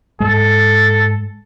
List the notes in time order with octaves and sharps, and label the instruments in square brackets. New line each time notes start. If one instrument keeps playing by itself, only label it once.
[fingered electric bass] G#2 G#3 [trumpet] A4